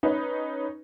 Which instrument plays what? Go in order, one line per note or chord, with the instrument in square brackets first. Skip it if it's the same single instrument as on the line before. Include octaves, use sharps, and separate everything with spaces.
[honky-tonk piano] C#4 D#4 B4